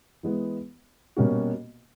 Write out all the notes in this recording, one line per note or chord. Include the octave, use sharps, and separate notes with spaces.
E3 G#3 B3
B2 G3 A#3 C#4 F#4